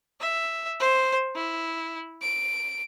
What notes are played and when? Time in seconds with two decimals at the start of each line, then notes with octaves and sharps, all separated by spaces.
0.20 E5
0.80 C5
1.35 E4
2.22 D7